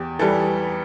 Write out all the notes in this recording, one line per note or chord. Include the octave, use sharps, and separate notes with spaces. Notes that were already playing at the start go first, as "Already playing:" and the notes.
Already playing: E2 G4
E3 G3 A4